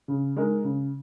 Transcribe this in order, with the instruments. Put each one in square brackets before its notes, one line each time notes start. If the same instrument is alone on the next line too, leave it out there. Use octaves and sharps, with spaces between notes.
[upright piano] C#3
G#3 D#4 A#4
C#3